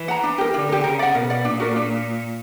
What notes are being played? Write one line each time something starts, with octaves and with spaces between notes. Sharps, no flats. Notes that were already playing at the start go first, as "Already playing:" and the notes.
Already playing: E3
F#5 A#5
D4
G4 A#4
D3 D4
G4 A#4
C#3 A#4
D5 F#5
B2 A#4
D5 F#5
A#2 D4
F#4 A#4 D5
D4